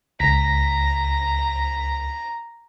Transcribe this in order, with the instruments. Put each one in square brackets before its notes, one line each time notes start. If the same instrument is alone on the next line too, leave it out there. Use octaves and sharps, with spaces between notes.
[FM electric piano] C#2 A#6 B6 [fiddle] A#5